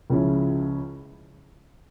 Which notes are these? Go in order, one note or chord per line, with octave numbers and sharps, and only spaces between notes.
C#2 C#3 F3 C#4 E4